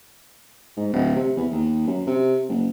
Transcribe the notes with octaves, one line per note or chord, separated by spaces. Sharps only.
G#2
D1
C3
E2
D#2
F#2
C3
F#1